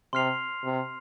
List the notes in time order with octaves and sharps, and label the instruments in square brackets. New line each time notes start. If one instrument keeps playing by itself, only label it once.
[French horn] C3 [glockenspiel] C6 F6 C7 F7
[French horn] C3